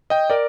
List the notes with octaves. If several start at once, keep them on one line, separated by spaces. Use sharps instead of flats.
D#5 G5
A#4 D5